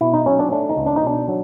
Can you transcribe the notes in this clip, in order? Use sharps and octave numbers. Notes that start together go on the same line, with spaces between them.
B2 E4
D#4
F#3 C#4
D4
A3 D4
D#4
C#2
D4
D#4
B2 D4
F#3